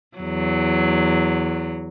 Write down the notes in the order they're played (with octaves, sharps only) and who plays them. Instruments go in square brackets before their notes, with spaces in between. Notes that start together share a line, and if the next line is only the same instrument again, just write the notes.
[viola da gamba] E2 F#3